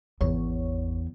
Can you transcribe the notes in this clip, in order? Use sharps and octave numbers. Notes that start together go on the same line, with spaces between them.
G#1 E2 C#5